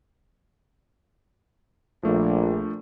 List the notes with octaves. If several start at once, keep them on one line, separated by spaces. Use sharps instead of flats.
A#1 F3 A3 D4